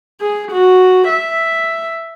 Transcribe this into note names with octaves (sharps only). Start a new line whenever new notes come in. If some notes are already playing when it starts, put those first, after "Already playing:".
G#4
F#4
E5